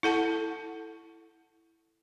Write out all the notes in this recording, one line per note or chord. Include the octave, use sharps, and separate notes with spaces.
E4 A4 F#5 A5